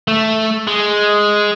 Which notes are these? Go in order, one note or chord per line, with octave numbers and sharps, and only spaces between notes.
A3
G#3